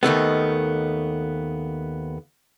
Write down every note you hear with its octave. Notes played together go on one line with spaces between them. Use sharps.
D#2 D#3 A3 B3